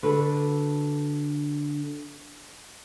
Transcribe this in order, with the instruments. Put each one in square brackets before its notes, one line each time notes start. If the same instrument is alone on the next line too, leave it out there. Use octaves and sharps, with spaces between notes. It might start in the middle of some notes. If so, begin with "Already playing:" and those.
[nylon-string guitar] D3 D4 F#4 A4 B4